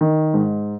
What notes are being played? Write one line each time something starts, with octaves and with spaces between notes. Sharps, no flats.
D#3
G#2